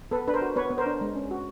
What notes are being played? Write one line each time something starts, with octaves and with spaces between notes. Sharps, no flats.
B3 A4 B4
D4 B4
A#4 C5
F#4
B3 B4 C#5
B3
A#4 C5
D4
G#3
C#4
F#4